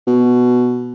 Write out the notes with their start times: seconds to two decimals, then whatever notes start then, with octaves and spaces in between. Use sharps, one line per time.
0.07 B2